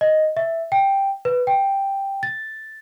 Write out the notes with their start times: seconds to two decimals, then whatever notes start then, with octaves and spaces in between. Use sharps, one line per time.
0.01 D#5
0.37 E5
0.72 G5
1.25 B4
1.47 G5
2.23 A6